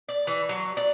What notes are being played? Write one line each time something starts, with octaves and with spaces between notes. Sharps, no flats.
D5
E3
F#3
D5